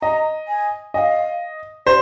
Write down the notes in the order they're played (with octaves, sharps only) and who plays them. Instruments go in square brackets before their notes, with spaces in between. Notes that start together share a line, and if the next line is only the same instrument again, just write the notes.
[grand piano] D#5 [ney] A#5
[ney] G#5
[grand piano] D#5 [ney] G#5
[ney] F5
[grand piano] C5 [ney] D5